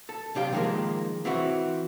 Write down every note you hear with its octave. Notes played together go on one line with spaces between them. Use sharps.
A4
B1 C3 D4 G4 F5
D#3 F3 G#3 A#3 A#4
E3 C4 E4 F#4